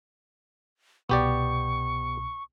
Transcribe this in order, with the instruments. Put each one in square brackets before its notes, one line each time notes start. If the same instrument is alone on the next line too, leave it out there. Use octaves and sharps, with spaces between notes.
[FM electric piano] C2 B2 [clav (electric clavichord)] B3 G4 D5 [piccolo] C#6